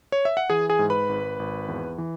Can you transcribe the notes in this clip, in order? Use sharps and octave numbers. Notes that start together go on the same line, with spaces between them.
C#5
E5
F#5
E3 G#4 G#5
G#4 G#5
G#2
B4 B5
G#1
G#1
E2
E3